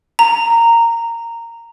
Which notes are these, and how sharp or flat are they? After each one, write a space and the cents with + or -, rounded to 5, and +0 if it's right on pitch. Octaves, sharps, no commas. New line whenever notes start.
A#5 -10